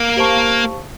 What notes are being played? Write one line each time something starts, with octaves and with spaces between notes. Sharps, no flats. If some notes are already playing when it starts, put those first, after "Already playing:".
Already playing: A#3
G4 C5 F5 A5 C#6